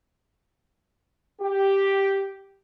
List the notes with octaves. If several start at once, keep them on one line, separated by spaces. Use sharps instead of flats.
G4